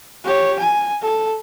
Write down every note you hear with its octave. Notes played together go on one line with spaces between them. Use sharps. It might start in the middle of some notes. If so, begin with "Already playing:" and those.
G4 C#5
G#5
A4